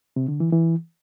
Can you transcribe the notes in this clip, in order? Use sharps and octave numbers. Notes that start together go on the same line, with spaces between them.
C3
D3
E3
E3